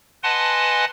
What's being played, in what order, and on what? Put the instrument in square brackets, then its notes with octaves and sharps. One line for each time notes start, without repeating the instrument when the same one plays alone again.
[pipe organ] B4 D#5 F#5 G#5 A5 C6